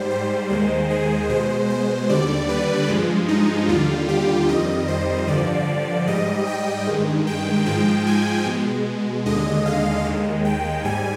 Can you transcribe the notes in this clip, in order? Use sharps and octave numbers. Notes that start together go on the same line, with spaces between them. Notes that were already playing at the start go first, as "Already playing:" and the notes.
Already playing: G#2 G3 C5
C5
D#2 D#3 G#3 C5
G#4
B2 G#3 C5
C5
D#2 D3 G3 D5
B4
G2 F3 G#3
D#4
D#2 D3 G3 F4
G4
F2 D#3 G3 D#5
C5
G2 D3 F3 D5
G#2 G3 D#5
G5
G2 D#3 G#3
G5
G#2 F3 G#3 G5
G#5
B2 G#3
D#2 D3 G#3 D#5
F5
D#2 D#3 G#3
G5
G#2 G3 G#5